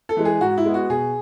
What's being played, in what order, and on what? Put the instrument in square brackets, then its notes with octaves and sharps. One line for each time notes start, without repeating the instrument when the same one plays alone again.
[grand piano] A4
E3 G#3
G#4
G#2 F#4
E4
G#3 B3
F#4
B2 G#4